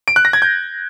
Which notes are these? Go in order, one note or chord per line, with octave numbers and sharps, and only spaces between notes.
D7
F#6
A#6
G#6
G6